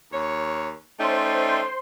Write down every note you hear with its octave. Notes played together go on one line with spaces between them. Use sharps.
D#2 C#5
A3 C#4 D#4 C5 D5 E5 G5 C6